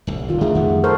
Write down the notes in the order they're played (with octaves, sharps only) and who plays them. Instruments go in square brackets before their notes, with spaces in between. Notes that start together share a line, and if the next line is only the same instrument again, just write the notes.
[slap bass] D1 C2
[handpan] D#3 F4
[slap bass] D2 D3 [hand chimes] A3 G#4 E5
[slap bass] F2 G3 B3 [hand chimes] F#5
[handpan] A4 A#4 C5 [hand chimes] C#6 F6 G6